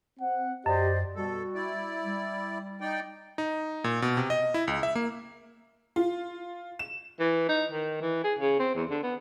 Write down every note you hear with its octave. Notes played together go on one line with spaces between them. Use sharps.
C4 F#5
F#2 G4 C5 D5 D#5
B2 G3 F#4 A4
E4 D5
G3
D#4 D5 G5
D#4
A#2
B2
C3
D#5
E4
C#2
E5
A#3
F4
E7
E3
D#4
D#3
E3
G#4
C#3
C4
E2
D3
B3